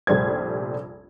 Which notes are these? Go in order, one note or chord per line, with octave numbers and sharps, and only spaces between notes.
F1 A#1 G3 C5 G#6